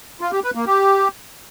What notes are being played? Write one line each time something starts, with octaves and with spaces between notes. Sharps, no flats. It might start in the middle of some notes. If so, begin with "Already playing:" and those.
F4
G4
B4
A#3
G4